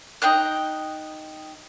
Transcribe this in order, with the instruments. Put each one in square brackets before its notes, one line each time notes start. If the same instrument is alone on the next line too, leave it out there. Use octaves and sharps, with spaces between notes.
[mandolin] D#4 G5 A#5 F#6